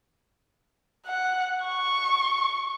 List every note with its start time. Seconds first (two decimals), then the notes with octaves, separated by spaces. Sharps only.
1.07 F#5
1.65 C#6